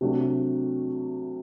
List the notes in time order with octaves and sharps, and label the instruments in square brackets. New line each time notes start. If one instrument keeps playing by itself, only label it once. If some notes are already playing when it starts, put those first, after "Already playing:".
[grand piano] C3 F#3 A3 D4 F#4